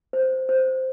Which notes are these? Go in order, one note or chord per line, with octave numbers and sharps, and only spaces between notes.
C5
C5